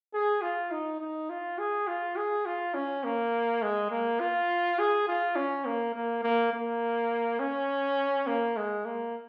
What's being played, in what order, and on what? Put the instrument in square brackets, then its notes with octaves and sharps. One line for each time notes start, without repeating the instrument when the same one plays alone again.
[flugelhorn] G#4
F4
D#4
D#4
F4
G#4
F4
G#4
F4
C#4
A#3
G#3
A#3
F4
G#4
F4
C#4
A#3
A#3
A#3
A#3
C#4
A#3
G#3
A#3